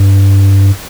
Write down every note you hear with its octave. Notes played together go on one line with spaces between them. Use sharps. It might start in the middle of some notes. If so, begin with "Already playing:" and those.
Already playing: G2